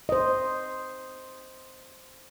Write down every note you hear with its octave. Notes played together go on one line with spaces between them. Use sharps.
C5 D#5